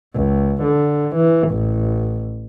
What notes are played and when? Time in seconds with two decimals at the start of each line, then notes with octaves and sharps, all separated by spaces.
0.14 C#2
0.63 D3
1.16 E3
1.49 A1